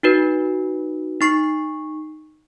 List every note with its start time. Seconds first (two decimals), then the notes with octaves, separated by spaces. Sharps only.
0.03 D#4 F#4 B4
1.21 D#4 C#6 C7